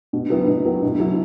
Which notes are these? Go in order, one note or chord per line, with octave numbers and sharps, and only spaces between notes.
B2
F#3 B3 E4
B2
F#3 B3 E4
B2
F#3 E4